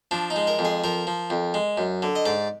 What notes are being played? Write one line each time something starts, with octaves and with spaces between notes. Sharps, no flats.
F3 D4
D#4
G#3
A#4
F2
G#4
F3 A#4
F3
F2
G#3
F#2
D3
D#5
G#2 D5